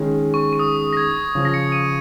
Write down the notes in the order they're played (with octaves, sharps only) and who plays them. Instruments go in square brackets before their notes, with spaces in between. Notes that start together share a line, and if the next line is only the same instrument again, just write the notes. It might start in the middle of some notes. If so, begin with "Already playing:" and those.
Already playing: [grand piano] D#3 G#3 C#4 G#4
[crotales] C#6
C#6
D#6
A#6
G#6
[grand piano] C#3 F3 C#4
[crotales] A#6
C#7
D#7